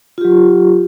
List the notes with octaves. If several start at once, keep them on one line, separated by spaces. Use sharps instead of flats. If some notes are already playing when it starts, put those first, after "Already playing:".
F#3 F4 G4